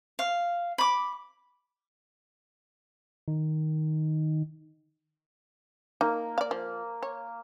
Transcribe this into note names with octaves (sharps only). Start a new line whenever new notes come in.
F5
B5 D6
D#3
A#3 D#4
D5 F5
F3
C#5